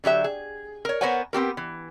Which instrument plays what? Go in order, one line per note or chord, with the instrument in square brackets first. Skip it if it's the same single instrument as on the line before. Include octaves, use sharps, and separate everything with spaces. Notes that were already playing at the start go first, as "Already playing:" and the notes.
[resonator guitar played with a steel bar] D3 F#3 G4 E5
G#4
A#4 C#5
B3 A#4 C5 C#5 F#5 G#5
B3 C4 G4 A#4
E3